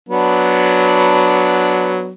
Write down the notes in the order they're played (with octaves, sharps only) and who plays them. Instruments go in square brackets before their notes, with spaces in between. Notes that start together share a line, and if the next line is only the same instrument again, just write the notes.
[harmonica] F#3 B3 D4